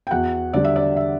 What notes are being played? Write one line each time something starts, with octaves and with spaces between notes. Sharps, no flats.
G5
E2 F#4 F#5
D3 G3 D5
E5
D5
E5